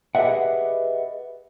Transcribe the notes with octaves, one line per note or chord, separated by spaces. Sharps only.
G4 G#4 B4 D#5 E5 F#5